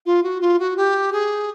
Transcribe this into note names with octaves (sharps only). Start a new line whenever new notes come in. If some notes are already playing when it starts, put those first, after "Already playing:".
F4
F#4
F4
F#4
G4
G#4